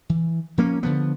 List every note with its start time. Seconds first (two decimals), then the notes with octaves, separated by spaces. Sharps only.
0.09 E3
0.58 F3 A#3 C#4
0.83 D3 F3 B3